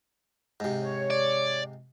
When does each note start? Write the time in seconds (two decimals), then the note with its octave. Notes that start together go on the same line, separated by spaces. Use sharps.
0.60 G#2 C3
0.82 C#5
1.10 D5